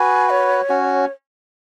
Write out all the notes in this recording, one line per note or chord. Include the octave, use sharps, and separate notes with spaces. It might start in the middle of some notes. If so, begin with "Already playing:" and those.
Already playing: F#4 B4 G#5
C#5
C#4 F#4